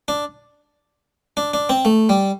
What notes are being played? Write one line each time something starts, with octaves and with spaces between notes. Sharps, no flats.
D4
D4
D4
C4
A3
G3